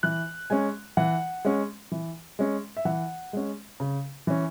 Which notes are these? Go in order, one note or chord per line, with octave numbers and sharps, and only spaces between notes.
E3 F#6
G#3 C#4 G#5
E3 F#5
G#3 C#4
E3
G#3 C#4
E5
E3 F#5
G#3 C#4
C#3
E3 C#4